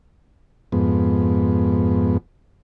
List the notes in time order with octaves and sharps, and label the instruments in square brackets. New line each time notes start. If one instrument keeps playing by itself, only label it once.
[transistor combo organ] F2 G#2 B3